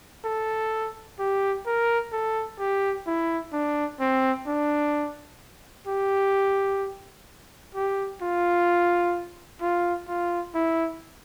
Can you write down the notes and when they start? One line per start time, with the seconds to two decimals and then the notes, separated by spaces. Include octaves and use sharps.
0.25 A4
1.19 G4
1.66 A#4
2.13 A4
2.59 G4
3.07 E4
3.53 D4
4.00 C4
4.47 D4
5.87 G4
7.75 G4
8.22 F4
9.61 F4
10.08 F4
10.55 E4